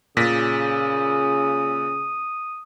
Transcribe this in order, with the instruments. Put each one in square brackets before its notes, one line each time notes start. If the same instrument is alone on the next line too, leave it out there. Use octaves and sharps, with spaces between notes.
[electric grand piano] A#2 A#6 B6 [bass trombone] C#3 [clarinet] D#6